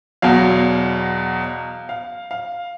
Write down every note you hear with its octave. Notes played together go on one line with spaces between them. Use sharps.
E2 B2 F#3 F5
F5
F5